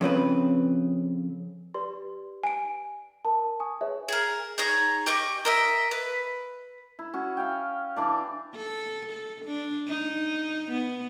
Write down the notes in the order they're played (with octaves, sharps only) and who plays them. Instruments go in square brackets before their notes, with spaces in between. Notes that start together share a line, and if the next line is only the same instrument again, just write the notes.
[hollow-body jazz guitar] F2 C#3 C4 B4
[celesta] G4 B4 D5 [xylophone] C6
[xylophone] G#5 D7
[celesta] A#4 [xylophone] A5
[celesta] G#5 C#6 D#6
[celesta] G#4 B4 C#5 [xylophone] E5
[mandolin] G#4 A#4
D#4 G#4 C#5 A#5
G4 D#5 C#6 D6
A#4 D#5 E5
B4
[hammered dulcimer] E4
C#4 F#4
F5 G5
E3 D4 D5
[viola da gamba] A4
A4
D4
D#4
B3